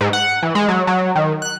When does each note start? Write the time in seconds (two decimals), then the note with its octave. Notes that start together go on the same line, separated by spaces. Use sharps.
0.01 G#2
0.13 F#5
0.43 E3
0.55 G#3
0.69 F#3
0.87 F#3
1.16 D#3
1.42 F#6